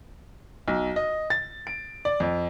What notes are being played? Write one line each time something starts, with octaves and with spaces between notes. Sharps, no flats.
B1
D#5
A6
D7
D5
F2